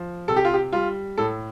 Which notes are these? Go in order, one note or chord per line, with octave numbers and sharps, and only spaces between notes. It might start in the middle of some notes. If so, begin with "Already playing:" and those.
Already playing: F3
C3 A4
G4
F4
G4
G3 F4
A2 A4